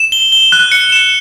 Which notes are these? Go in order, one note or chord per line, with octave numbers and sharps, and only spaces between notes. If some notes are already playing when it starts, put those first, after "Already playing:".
Already playing: E7
G7
G7
F#6
C#7
E7